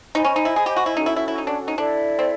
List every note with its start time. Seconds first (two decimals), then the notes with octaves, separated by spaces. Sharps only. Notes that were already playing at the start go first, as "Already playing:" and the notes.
0.15 D#4 C5 D#5 G#5 B5
0.25 C#4
0.36 D#4
0.45 E4
0.56 G#4
0.66 G4
0.76 F#4
0.86 E4
0.97 C#4 D#4 F#4 A4
1.06 E4
1.16 E4
1.28 E4
1.38 D#4
1.47 D4
1.68 D#4
1.78 D4 E4 A4 D5
2.19 C4